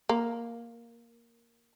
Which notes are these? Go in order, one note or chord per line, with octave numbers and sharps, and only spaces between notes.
A#3